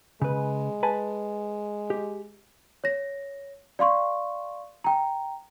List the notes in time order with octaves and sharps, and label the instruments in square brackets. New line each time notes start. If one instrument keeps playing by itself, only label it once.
[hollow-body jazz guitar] C#3 B4 [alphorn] G#3
[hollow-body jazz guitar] B4 G#5 A5
G4
[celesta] C#5 A#6
D5 F5 C6 C#6
G5 A#5